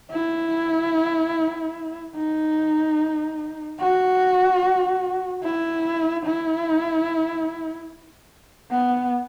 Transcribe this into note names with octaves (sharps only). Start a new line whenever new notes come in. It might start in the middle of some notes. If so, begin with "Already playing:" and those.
E4
D#4
F#4
E4
E4
B3